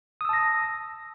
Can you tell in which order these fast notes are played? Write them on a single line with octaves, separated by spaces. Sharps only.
D#6 E6 A5 A#6